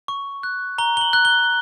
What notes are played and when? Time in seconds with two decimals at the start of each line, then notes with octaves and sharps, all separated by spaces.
0.08 C#6
0.43 F#6
0.78 A#5 G7
0.97 G7
1.01 F#7
1.13 F#6
1.25 G7